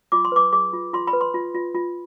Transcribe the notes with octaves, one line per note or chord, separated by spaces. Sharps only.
F4 D6
C6
B4 D6
G#4 D6
F4
F4 C6
B5
B4
C6
F4
F4
F4